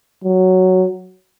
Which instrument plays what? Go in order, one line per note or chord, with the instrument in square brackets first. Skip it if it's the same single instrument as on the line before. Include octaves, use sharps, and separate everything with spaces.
[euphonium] F#3